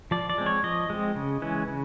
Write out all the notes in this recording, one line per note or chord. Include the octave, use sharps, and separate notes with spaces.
F3 D5
D5
G#3 C4
C#5
F3 D#5
G#3 C4
C#3
E3 G#3 C#4
C#3